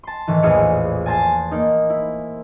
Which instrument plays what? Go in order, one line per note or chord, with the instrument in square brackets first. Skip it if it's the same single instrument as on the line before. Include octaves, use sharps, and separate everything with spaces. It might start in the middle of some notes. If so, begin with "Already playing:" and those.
[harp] A5 C6
A2 D#3 E3
A#1 E2 A2 G#4 F5 C#7
G#5 A5 C6 A6
A#3 D#4
E4